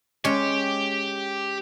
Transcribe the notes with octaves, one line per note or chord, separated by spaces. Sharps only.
G#3 C#4 G4 C#5